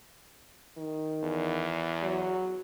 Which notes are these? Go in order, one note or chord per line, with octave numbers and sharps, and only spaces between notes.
D#3
E2
F#3